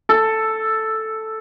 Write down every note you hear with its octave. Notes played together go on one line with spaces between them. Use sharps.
A4